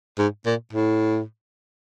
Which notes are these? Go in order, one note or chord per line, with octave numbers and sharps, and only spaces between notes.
G#2
A#2
A2